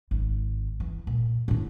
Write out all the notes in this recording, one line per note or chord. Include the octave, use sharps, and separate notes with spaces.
G#1
E3
A#2
A2 D4